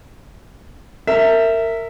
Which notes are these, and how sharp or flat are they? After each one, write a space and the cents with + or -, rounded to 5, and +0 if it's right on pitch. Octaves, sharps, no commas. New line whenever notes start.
A#4 -25 E5 +0